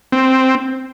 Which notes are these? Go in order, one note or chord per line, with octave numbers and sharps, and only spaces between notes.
C4